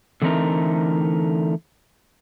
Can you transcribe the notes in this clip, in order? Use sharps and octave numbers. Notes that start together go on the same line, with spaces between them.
D3 E3 A3 C4 D#4 A#4